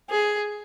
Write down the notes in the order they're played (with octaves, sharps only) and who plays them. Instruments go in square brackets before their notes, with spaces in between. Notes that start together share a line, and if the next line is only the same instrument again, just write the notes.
[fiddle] G#4